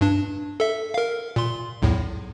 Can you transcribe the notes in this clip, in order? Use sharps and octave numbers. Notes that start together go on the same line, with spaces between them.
G2 D4
A4 E5
A#4 F5
A#2 C6
B1 E2 A2